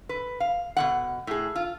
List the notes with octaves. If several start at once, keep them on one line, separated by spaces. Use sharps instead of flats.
B4
F5
B2 F3 F#5
A2 G#4
F4